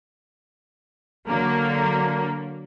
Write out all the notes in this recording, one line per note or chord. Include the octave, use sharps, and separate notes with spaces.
D3 F#3 A#3